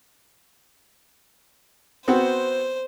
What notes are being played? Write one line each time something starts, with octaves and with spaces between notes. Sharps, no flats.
B3 C4 F#4 C5